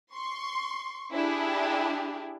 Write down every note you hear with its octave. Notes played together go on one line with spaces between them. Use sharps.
C6 C#6
D4 E4 G4 G#4